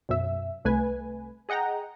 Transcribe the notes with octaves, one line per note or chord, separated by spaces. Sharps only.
B1 F#2 E5
C2 A3 B4 G#5
G#4 D#5 F#5 G5 A#5